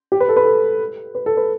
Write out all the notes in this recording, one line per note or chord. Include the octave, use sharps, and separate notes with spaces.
G4
B4
A4
B4
A4
B4
A4
B4